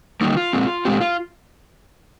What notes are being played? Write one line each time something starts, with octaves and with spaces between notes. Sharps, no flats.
D3 G3 A#3 D#4
F4
A#2 G#3 C4
A#2 G#3 C4 G4
F4